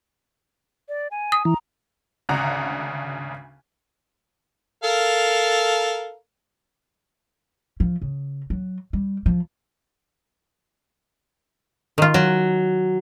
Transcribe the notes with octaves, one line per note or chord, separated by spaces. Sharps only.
D5
G#5
D#6
E3 A#5
G#1 D2 C#3 D4 F#5 A#5
A4 A#4 F5
F3
C#3
F#3
G3
F3
D#3 F4
F#3